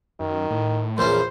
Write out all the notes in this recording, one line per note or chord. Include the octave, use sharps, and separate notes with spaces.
F#2 D#3
A2
A#1 E2 C#4 A#4 C5